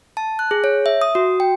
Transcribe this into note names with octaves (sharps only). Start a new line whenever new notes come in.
A5
F#6
G#4
C#5
E5
D#6
F#4
G5